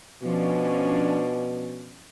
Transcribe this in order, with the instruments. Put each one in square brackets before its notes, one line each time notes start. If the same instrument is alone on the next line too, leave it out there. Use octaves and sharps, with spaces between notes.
[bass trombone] B2 [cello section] F3 C#4 D4